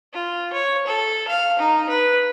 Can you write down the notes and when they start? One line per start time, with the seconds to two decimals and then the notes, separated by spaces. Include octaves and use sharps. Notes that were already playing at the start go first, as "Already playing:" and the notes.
0.13 F4
0.53 C#5
0.87 A4
1.28 F5
1.59 D#4
1.89 B4